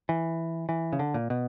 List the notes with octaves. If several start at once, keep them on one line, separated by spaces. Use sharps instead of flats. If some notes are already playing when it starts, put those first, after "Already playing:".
E3
E3
C#3
D3
A#2
B2